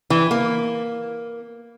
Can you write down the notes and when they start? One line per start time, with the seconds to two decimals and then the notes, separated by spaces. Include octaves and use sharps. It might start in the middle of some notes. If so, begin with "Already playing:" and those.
0.10 E3
0.31 A#3